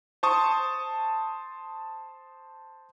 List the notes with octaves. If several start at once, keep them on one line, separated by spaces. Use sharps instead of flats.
C5 A5 C#6 D#6